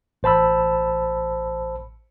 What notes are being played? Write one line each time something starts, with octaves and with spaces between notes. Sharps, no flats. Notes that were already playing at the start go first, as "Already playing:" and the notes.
A1 C5 A5 B5 E6